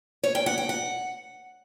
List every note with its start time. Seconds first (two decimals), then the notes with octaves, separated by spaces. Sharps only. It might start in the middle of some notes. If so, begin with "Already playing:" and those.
0.23 C#5
0.35 G5
0.46 F#5
0.58 G5
0.69 F#5